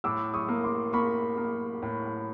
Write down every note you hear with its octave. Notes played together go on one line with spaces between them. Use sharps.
A2 D6 E6
C#6 D#6
A#3
C6 D6
A#3 B5 C#6
A#3
A2